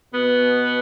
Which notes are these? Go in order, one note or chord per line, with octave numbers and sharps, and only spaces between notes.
B2 B3